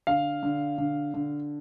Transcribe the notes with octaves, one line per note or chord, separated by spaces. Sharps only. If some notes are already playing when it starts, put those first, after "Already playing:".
D3 F5
D3
D3
D3